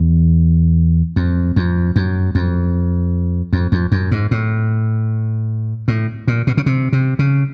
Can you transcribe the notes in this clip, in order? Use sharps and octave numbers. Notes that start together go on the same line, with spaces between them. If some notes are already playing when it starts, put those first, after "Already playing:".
Already playing: E2
F2
F2
F#2
F2
F2
F2
F#2
G#2
A2
A2
A#2
B2
C#3
C3
C3
C#3